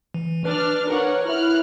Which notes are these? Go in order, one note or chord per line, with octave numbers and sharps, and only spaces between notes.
E3
D4 B4 F6
A#4 C#5 F#5
E4 F6 F#6